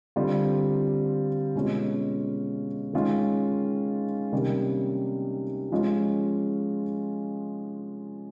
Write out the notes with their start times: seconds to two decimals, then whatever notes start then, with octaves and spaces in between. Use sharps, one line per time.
0.16 D3 G3 C4 F4
1.55 B2 G#3 C#4 F4
2.93 D#3 G#3 C#4 F4
4.32 C3 D#3 G3 A#3 C#4
5.72 F3 G#3 C#4 F4